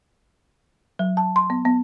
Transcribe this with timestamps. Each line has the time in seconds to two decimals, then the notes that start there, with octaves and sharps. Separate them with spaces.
0.99 F#3
1.17 A5
1.36 C6
1.50 B3
1.65 B3